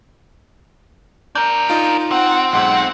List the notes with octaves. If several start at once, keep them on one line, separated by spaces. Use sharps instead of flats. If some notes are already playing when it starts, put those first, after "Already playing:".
D4 A#4 G6
D#4 F4 D7
C4 F#5
B1 G#2 F#5